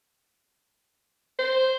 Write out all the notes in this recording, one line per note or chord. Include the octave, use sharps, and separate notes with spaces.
C5